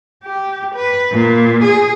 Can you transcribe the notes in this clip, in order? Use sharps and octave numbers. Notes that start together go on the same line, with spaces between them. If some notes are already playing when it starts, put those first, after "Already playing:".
G4
B4
A#2
G#4